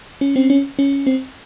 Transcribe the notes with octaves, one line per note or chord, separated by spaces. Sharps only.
C#4
C4
C#4
C#4
C4